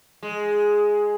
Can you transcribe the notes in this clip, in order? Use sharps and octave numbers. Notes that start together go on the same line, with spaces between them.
G#3